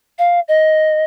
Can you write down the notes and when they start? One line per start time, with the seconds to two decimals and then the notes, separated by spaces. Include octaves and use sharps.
0.19 F5
0.48 D#5